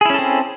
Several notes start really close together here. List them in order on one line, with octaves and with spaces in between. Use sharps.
G#4 E4 C#4 A4 C4